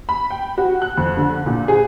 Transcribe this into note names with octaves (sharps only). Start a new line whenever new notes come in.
B5
G5
F#4
F#6
F2
D3
A#2
G#4